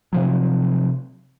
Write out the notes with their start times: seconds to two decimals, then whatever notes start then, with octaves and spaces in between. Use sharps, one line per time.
0.13 C3 F3 F#3